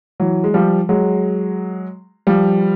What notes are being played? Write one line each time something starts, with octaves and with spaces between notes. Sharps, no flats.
E3 F#3
G#3
F3 G3
F#3 G#3
F3 G3